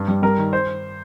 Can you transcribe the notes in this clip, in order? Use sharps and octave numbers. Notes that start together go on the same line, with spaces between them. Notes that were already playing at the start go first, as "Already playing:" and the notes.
Already playing: G2
G3
G3 A#4
D#3
C5